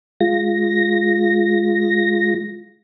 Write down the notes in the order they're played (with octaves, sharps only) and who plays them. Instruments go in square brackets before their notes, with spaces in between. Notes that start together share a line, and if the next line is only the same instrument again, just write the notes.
[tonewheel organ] G#3 F4 A#6